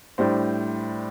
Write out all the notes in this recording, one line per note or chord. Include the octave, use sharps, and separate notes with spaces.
A2 G3 D4 C5